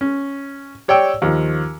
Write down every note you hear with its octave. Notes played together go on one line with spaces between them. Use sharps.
C#4
G4 C#5 D5 G5 E6
D#2 F3